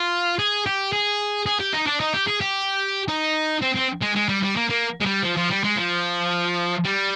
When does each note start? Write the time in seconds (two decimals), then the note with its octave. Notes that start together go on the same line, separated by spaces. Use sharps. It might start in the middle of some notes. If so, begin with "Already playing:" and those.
Already playing: F4
0.39 G#4
0.66 G4
0.93 G#4
1.46 G#4
1.60 G4
1.73 D#4
1.87 D4
2.00 D#4
2.14 G4
2.27 G#4
2.41 G4
3.08 D#4
3.62 C4
3.76 C4
4.02 G#3
4.16 G#3
4.29 G3
4.43 G3
4.56 A#3
4.69 A#3
5.00 G#3
5.05 G3
5.23 F3
5.37 F3
5.50 G3
5.64 G#3
5.77 F3
6.85 G3